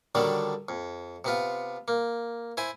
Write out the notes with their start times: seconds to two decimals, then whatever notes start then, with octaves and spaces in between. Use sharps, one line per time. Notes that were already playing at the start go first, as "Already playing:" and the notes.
0.15 D3 D#3 F#3 G3 D4
0.69 F2
1.25 C3 B3 F4
1.88 A#3
2.57 E4 C5 G#5